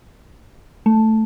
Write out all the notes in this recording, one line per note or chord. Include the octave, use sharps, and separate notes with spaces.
A3